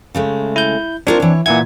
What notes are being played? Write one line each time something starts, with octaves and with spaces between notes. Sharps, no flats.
C#3 G#3 A3
E4 G6
C4 D4 F4 A#4 C#5
E3 C#5
A#2 E3 E5 F#5 G#5 G#6